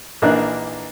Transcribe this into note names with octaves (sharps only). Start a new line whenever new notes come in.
A#1 E3 A#3 D4 D#4 F#6